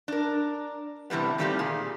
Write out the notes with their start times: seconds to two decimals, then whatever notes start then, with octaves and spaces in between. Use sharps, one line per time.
0.08 D4 A#4
1.10 A2 C3 E3 G3 B3
1.38 A#2 D#3 G3 A3 C4 G4
1.59 A#2 G#4